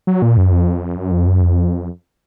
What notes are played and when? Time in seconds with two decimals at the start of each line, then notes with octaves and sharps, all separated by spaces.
0.07 F#3
0.22 A#2
0.37 F#2
0.52 F2
0.97 F#2
1.12 F2
1.27 F#2
1.41 F2